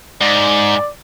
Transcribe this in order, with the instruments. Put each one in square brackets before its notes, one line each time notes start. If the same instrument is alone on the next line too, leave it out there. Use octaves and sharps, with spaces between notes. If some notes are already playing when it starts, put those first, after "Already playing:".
[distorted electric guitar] G#2 [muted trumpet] D5